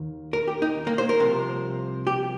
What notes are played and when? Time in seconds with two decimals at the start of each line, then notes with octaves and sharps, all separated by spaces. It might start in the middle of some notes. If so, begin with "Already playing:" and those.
Already playing: D#2 D#3
0.33 A#4
0.48 G4
0.62 D#4
0.87 A#3
0.98 C5
1.09 A#4
1.20 C2 C3 F3
2.07 G4